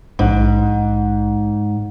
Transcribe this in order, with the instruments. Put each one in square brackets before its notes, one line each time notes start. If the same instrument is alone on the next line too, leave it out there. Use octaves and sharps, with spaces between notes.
[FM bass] A#1 [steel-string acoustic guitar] G#2